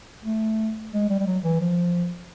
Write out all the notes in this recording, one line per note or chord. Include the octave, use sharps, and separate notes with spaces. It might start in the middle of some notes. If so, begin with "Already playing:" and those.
A3
G#3
G3
G3
F#3
E3
F3